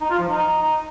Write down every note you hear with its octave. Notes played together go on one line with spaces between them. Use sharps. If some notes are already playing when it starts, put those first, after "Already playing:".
D#4
F4
F3
D#4